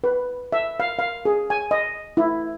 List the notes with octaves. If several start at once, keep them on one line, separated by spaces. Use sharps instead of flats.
B4
E5
F5
F5
G#4
G#5
D#5
E4